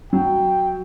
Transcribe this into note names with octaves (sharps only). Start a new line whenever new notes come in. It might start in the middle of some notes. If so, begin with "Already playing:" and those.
F#3 G5